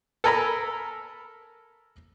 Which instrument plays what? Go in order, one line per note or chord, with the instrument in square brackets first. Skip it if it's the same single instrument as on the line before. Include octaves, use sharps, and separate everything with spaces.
[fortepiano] A4 A#4 G#5 A#5 B5 E6